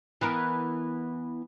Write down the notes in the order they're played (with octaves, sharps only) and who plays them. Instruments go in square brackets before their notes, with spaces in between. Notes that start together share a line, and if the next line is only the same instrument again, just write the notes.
[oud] E3 B3 A#4